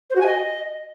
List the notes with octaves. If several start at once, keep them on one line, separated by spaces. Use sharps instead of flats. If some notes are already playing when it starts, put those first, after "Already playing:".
C5
F#4
G#5
D#5